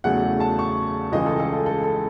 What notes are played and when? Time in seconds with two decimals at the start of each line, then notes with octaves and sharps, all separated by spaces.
0.04 E2 C#3 F#3 A3 F#5
0.40 A5
0.59 C#6
1.12 C#2 C#3 E3 G#3 D#5
1.26 A4
1.40 A4
1.53 A4
1.66 A4
1.84 A4